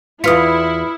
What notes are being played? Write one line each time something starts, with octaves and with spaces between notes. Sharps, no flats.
E2 E4 F4 B4 D#6 F6 B6 C#7